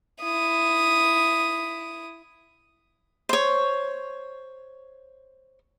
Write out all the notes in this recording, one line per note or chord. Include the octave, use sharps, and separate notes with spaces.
E4 D#6
C5 C#5